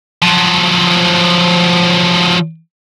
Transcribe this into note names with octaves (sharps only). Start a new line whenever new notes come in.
F3 F#3